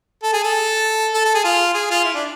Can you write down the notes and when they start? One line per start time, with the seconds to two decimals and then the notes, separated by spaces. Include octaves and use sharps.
0.23 A4
0.33 G#4
0.44 A4
1.14 A4
1.25 A4
1.35 G#4
1.44 F4
1.74 G#4
1.90 F4
2.04 E4
2.14 D4